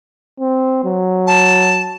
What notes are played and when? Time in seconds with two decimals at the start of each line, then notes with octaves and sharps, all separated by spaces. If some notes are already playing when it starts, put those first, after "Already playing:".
0.40 C4
0.84 F#3
1.27 A5